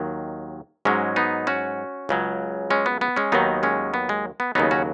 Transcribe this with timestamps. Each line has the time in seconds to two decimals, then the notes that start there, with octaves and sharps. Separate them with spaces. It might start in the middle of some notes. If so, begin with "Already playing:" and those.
Already playing: D#2 D#3 F#3
0.85 G#2 F#3 G#3 C#4
1.16 B3 D#4
1.47 C#4 F#4
2.09 C#2 C#3 F#3
2.70 G#3 C#4
2.86 B3
3.01 B3
3.16 G#3 C#4
3.32 D#2 D#3 F#3 B3 D#4
3.63 G#3 C#4
3.94 B3
4.09 G#3
4.40 B3
4.55 D#2 C#3 F#3 B3 D#4
4.71 C#4 F#4